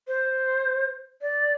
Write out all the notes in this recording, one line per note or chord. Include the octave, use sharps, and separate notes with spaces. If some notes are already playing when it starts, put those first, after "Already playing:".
C5
D5